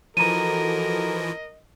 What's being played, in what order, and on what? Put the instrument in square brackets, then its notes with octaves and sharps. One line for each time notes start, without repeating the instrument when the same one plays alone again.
[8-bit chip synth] E3 F3 [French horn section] F#4 A4 [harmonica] A#4 D#5 [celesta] A#5 D#7